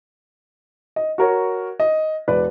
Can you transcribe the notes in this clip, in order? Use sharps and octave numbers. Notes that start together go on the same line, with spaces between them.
D#5
F#4 A#4 C#5
D#5
E1 B4 D5